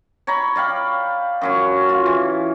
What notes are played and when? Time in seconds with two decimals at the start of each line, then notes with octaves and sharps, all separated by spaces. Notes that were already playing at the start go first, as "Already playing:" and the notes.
0.27 C#5 A#5 B5
0.56 D5 F5 G5 B5
1.41 F#2 F#3 C#4
1.89 F4
2.06 E3